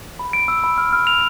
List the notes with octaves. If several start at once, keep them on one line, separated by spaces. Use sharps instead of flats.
B5
D7
E6
B5
F6
F6
F7